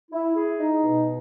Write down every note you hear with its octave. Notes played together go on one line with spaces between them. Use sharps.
E4
G#4
D#4
B2